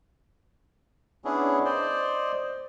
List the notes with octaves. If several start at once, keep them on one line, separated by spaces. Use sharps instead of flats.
B3 C#4 D4 E4 G#4
C5 D5 D#5